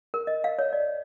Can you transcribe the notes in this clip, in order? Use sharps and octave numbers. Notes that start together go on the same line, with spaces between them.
A#4
D#5
F5
C#5
D5